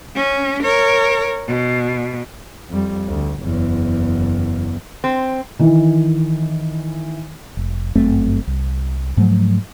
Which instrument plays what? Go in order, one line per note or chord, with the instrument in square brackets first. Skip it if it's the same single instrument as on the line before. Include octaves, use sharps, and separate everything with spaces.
[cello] C#4
A#4 C#5
B2
[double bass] F2 G3
D2
F#1 E2
[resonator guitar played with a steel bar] C4
[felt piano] D#3 E3
[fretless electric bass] F1
G1 F#2 A3 C4
C2
G#2 F3 F#3 A3